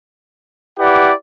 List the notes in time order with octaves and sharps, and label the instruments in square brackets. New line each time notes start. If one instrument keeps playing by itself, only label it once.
[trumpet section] E4 G4 B4 D5 F#5